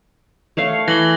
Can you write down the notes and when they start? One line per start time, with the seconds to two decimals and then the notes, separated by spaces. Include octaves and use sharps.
0.57 A3 C#5 F5
0.88 E3 A#6 F#7 G7